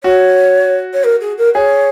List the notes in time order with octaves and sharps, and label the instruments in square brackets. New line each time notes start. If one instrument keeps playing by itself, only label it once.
[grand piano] F#4 [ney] C#5
[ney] C#5
A#4
G#4
A#4
[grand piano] G#4 [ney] C#5